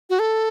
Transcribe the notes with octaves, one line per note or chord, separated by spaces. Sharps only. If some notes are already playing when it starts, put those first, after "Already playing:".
F#4
A4